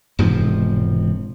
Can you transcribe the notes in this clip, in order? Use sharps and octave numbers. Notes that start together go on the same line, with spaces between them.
E1 G#2 C3 F3